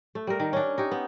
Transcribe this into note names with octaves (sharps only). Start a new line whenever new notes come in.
A3
G3 A#4
D#3
C#4 D4
D#4 G4 C#5
B3